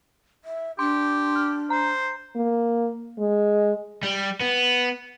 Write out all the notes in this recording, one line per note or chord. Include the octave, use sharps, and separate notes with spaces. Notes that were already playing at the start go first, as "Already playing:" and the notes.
E5
D4 G4 C6
F6
C5 A#5
A#3
G#3
G3
B3